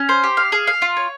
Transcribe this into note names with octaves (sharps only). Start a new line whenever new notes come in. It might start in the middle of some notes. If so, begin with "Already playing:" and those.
Already playing: C#4
C5
G4
F5
G#4
F5
F4
C#5